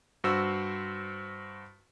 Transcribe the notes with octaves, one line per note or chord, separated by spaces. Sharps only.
G2 F#4 C5 E6